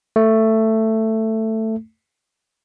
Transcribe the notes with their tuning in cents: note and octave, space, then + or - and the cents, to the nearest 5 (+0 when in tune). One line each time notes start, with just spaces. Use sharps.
A3 +10